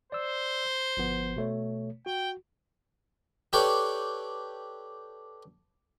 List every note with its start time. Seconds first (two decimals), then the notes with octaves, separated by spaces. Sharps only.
0.12 C5 D5 E6
0.97 G1 F3 B3
1.36 B2 A3 C#5
2.06 F#4 G5
3.53 G4 A4 B4 C#5 D5 G5